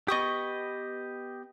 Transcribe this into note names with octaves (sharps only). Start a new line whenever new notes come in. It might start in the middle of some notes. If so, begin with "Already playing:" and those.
B3 G4 D#5 C#6 D#6